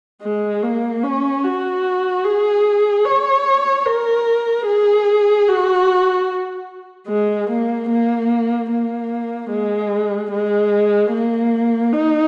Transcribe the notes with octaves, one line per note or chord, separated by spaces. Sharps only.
G#3
A#3
C#4
F#4
G#4
C#5
A#4
G#4
F#4
G#3
A#3
A#3
A#3
G#3
G#3
A#3
D#4